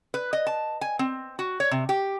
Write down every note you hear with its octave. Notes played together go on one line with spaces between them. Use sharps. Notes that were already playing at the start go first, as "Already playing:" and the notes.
B4
D#5
A5
G#5
C4
F#4
C#5
C3
G4